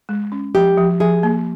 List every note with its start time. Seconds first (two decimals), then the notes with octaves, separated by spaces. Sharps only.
0.09 G#3
0.32 C#4
0.55 F3 G4
0.78 F3
1.00 F3 G#4
1.23 A#3